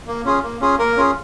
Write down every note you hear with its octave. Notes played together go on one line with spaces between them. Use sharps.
A#3
C#4 F4 G#4
A#3
C#4 F4 G#4
A#3 A#4
C#4 F4 G#4